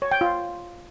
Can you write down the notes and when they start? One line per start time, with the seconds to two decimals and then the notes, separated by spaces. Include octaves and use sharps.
0.02 C#5
0.11 G5
0.21 F4